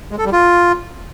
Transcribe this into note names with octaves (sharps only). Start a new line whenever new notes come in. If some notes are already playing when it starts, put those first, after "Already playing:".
G#3
A4
G3
F4